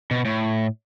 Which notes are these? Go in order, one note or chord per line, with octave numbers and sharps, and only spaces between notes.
B2
A2